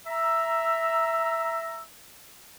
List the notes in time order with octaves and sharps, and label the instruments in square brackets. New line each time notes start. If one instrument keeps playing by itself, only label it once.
[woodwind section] E5 A#5 E6